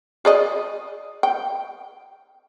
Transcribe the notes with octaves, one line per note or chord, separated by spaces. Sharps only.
G#4 D5 D#5
G5